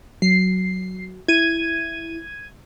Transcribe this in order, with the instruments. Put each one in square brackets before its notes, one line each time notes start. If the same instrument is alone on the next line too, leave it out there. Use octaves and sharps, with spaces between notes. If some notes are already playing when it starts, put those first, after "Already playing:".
[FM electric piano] F#3 [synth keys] C7
[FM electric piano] E4 [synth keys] G#6 D#7